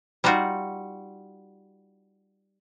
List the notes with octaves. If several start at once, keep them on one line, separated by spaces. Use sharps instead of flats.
G3 D#4 F4 F#4